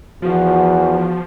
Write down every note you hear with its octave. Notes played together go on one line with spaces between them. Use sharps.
E2 F3 F#4